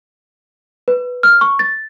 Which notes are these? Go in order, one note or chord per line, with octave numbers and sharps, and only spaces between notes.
B4
F6
C#6
A6